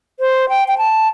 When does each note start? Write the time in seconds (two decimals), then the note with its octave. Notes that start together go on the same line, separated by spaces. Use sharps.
0.20 C5
0.49 G5
0.68 G5
0.78 A5